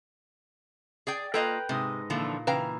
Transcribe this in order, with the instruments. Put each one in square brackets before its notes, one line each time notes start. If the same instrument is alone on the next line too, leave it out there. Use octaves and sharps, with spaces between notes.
[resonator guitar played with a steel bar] G#4 D5 G5
[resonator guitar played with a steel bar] A#3 F4 D#5 [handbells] A4 [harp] B4 G5 G6
[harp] G#2 D#4 D#6 [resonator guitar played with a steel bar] C3
[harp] A#2 [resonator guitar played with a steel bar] D3 E3 F3
[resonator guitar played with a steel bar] C#3 E3 A#5 [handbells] B4 F5 G5